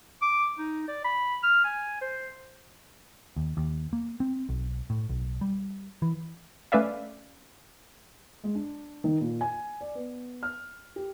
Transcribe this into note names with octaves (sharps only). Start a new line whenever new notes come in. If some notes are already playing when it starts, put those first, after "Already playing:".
D6
D#4
D5
B5
F6
G#5
C5
D#2
D#2
A#3
C4
B1
A2
B1
G3
E3
A3 C#4 B4 D5 E5 F5
G#3
D4
D#3
A#2
G#5
D5
B3
F6
G4